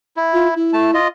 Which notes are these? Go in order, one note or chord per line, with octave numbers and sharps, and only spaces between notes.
E4
F4
E4
A3 A5
F4 D#5